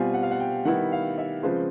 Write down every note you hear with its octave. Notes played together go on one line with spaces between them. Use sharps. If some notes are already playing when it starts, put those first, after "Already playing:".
Already playing: B2 G3 C4 F4 G#5
F#5
F5
F#5
G5
D#3 G3 B3 E4 F#5
F5
E5
C#3 F3 G#3 C4 F4 B4